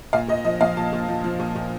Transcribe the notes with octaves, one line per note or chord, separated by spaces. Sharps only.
A#2 F5
A#2 D#5
F3 D#5
F3 F5
A#2 A5
A#2
F3
F3
A#2
A#2